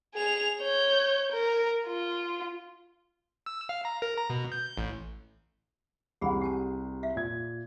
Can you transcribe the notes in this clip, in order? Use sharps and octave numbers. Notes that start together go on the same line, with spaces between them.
G#4 F7
C#5 G6
A#4
F4
E6
F5
A#5
A#4
A#5
B2
G6
A1
C2 G3 G4 G#4 F#5 B5
G4 G#5 A5
E5 F5
A#2 G#6